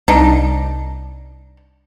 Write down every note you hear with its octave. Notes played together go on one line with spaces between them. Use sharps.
C2 D4 D#4